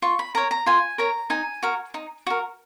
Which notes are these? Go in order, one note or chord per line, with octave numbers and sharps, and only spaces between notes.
F4 C#6
B5
A#4 C#5 A#5
A#5
F4 G#5
A#4 C#5 A#5
D#4 G#5
F#4 A#4
D#4
F#4 A#4